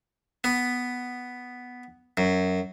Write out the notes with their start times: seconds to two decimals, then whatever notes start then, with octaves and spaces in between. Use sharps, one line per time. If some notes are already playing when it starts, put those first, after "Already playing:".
0.44 B3
2.17 F#2